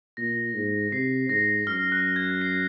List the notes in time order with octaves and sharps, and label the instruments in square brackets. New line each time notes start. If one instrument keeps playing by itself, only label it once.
[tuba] A#2 [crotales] A#6
[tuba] G#2
[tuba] C3 [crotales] C7
[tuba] G#2 [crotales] A#6
[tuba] F#2 [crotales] F6
[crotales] F#6
G#6
C7